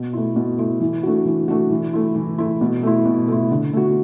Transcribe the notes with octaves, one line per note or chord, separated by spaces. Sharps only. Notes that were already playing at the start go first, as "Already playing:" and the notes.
Already playing: B2
A3 E4
B2
A3 E4
E3
A3 D4 F#4
E3
A3 D4 F#4
E3
A3 E4
E3
A3 E4
B2
A3 E4
B2
A3 E4
D3
A3 F#4